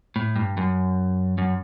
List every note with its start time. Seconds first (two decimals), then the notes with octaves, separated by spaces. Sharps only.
0.16 A2
0.36 G2
0.57 F#2
1.38 F#2